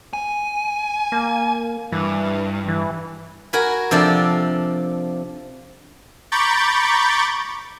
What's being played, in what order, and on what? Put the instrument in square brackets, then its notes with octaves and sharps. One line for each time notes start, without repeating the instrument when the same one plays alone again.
[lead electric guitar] G#5
[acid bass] A#3
[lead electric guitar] G2 [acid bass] E3
[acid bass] E3
[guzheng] F#4 A#4 G#5 B5
C3 F3 D4 A4
[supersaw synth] A#5 B5 C#6 D6 G6 A6